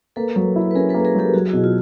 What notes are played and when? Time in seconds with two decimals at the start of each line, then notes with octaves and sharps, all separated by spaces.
0.16 A#3 A4 B4
0.36 F#3
0.56 E4
0.71 B4
0.75 C#4 G#4 A#4
0.89 A4 B4
0.94 A#3
1.05 G#4 A#4
1.15 F#3 G4 A4
1.34 F#3 F#4 G#4
1.48 E4 F#4
1.53 B2
1.64 F4